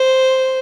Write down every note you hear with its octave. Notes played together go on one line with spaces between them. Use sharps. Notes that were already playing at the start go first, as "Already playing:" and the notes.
Already playing: C5